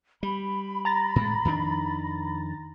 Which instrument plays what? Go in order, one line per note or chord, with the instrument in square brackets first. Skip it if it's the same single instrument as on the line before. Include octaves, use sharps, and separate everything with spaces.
[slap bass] G3 [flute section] B5
[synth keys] A#5 A6 A#6
[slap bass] A2 G#3
F2 D#3 D4